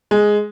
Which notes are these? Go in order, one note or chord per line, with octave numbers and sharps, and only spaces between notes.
G#3